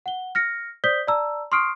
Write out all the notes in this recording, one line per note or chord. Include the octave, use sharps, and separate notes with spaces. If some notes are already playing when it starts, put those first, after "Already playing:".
F#5 G7
F6 A#6 C#7
C5 D5 D#6 G6 B6 G7
D5 A5 A#5 E6
C6 C#6 D#6 F6 C7 D7